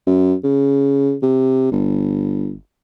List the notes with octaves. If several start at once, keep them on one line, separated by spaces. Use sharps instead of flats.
F#2
C#3
C3
G1